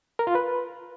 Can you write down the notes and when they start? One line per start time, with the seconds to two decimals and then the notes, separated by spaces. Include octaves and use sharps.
0.19 A#4
0.27 F4
0.35 B4